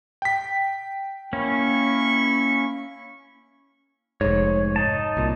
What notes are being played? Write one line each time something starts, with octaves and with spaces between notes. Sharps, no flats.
G5 B6
A#3 C#4 E4 B5 C#6
F1 G#2 C#5
D#4 A5
C2 A#2